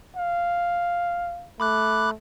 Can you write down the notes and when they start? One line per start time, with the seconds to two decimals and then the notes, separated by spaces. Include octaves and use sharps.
0.16 F5
1.60 A3 B5 D6 F#6